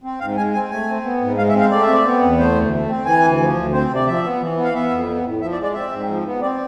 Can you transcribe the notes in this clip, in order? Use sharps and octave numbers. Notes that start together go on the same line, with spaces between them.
C4
G#2 F5
G#3 G#5
C4 G#5
A3 G#5
C4
B3
G#2
G#3 F5
E5
C4
F5
A3 D5
E5
C4
D5
B3
E2
A3 C5
D2
A3
C4
E3 G#5
D2
F3
D2
C4 C5
C3
D5
F3 E5
B3
E3
B3
F5
B3 E5
F2
B3
A2
F3 E5
D5
G#3
D5
C4 E5
G#2
F3
B3
C4 D5